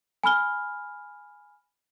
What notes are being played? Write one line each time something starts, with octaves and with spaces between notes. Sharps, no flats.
G#5 B5 F6 G7